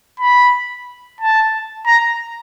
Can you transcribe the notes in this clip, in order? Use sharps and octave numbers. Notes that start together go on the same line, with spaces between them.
B5
A5
A#5